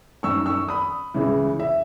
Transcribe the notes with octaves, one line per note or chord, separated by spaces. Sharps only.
F#2 D#3 C#6 E6
C#6 E6
B5 D#6
C#2 C#3 E3
E5